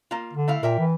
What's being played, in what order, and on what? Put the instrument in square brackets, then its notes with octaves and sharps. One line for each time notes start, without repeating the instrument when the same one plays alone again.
[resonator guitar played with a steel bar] A#3 F4
[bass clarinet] D3
[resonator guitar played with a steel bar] A3 E4 F5
[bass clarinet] A#2 [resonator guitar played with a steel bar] A#4 E5 G5
[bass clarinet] E3